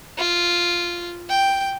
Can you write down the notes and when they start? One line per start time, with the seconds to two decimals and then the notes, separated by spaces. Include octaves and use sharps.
0.18 F4
1.30 G5